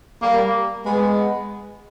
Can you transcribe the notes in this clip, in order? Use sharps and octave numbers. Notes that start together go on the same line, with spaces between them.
G3 A#3
G#3 B3